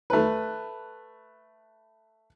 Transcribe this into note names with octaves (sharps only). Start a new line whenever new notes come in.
A3 B4